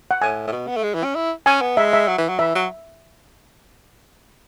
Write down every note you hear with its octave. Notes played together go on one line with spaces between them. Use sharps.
F#5
A2 G#5
A2
B2
B3
A3
G#3
E3
C#4
E4
C#4 G#5
B3
G#3 E5
E5
F#3
E3
F#3
E3 E5
F#3